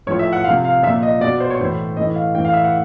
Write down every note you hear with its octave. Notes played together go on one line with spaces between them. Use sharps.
A2 F3 C#5
E5
F#5
C3 F3 F5
F5
A#2 F3 E5
D#5
B2 D5
C5
C#5
A2 E3 C5
A2 E3 D#5
F5
A2 E3 G5
F5
E5
F#5